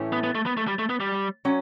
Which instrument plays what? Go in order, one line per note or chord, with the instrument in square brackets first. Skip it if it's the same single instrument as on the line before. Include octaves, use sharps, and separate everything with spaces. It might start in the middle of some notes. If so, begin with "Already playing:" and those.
Already playing: [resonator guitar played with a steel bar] A2 E3 A3 C#4
[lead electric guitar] B3
B3
A3
B3
A3
G3
A3
B3
G3
[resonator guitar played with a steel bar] F#3 C#4